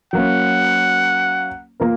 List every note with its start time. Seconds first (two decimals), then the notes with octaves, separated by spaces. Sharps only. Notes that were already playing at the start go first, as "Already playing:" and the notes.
0.13 F#3 A#3 C#4 F#5
1.80 A#3 F4 A#4